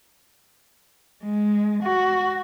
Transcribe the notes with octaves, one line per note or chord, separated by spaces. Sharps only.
G#3
F#4